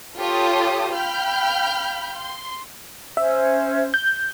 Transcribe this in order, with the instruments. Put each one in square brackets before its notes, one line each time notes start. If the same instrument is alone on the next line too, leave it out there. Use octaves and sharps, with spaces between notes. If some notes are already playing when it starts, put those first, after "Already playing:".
[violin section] F4 G4 A4 C#5 A5 D#6
F5 G5 B5 F6 G6
C6
[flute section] C#4 C5 [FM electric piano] E5
[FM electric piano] G6